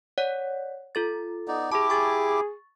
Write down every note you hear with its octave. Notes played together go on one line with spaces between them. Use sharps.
C#5 D5 F#5
F4 A4 A6
B3 D#4 D5
E4 G4 G#4 A5 D6
G#4 C#6 A6